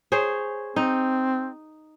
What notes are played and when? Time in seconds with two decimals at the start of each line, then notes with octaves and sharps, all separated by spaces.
0.12 G#4 C5 C#5
0.76 C4 D#4